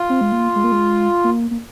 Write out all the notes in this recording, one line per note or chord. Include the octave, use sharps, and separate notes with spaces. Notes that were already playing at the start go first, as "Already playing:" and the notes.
Already playing: F4
C4
G#3
A#3
G#3
A#3
G#3
A#3
A#3